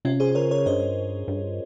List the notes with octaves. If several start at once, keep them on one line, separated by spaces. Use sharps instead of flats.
C3 C#4 F4
G#4 C5
C#3 A#4 C#5
A#4 C#5
G2 C5 D#5
G2